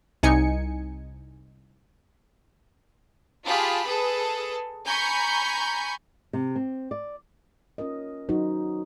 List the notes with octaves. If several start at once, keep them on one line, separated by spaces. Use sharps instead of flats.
C2 D#4 G#5 C#7
F4 G4 G#4 A5 B5
G#4 A4 B4
G#5 A#5 B5 C#6 G6
C3
C4
D5
C#4 F4 A#4 D#5
F#3 D#4 F#4 C5